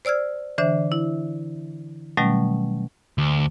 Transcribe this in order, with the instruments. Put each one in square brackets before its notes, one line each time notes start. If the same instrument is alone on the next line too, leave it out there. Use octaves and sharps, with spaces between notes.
[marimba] C5 D5 E6 F6 G#6
D3 E3 D4 C5 E5
E4
B2 D#3 F#3 G3 A3 C#4
[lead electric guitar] D2